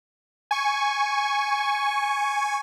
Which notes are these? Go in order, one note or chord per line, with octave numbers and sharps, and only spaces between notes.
G#5 C#6